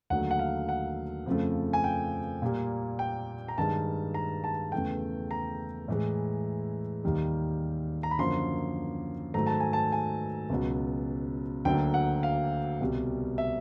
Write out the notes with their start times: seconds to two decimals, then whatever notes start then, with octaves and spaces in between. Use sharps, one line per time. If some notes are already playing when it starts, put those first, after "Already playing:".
0.10 D#2 D3 F#3 A3 F#5
0.31 F#5
0.39 F5
0.69 F#5
1.26 F2 C#3 F3 A3
1.73 G#5
1.84 G5
2.42 A#2 G3 A#3
2.99 G5
3.48 A#5
3.58 G2 D#3 G#3 A5
4.14 A#5
4.44 A5
4.72 E2 C#3 E3 A3 G5
5.31 A#5
5.88 A2 E3 G#3
7.04 D#2 D#3 G3
8.03 A#5
8.11 B5
8.19 F#2 D3 F3 A#3 C6
9.34 G#2 D#3 F#3 A3 A#5
9.47 A5
9.60 G#5
9.73 A5
9.92 G#5
10.50 C#2 B2 F#3
11.65 D2 D3 F#3 A#3 G5
11.94 F#5
12.23 F5
12.81 C2 B2 G3
13.38 E5